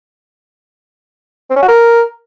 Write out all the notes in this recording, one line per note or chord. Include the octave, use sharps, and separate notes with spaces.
C4
C#4
F#4
A#4